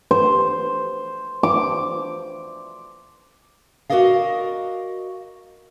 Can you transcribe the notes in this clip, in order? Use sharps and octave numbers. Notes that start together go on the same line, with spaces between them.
C5
D6
F#4 G4 A#4 D5 D#5 F5